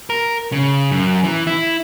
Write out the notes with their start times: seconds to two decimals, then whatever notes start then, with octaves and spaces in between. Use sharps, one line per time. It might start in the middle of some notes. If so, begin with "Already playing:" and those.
0.10 A#4
0.52 C#3
0.91 F#2
1.24 E3
1.47 E4